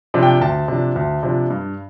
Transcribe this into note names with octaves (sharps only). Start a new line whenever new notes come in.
C3 F3 D4
G5
D2 A5
C3 F3 D4
D2
C3 F3 D4
G2